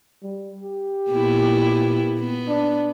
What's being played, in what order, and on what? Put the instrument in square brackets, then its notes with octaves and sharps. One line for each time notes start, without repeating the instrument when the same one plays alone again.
[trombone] G3
G4
[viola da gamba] A#2 B3 E4
B3
[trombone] D4